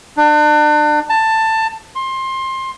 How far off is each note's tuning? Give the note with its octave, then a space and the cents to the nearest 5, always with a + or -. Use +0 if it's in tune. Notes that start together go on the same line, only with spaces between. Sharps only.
D4 +35
A5 +15
C6 +20